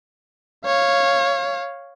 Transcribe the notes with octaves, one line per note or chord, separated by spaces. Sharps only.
C#5 F5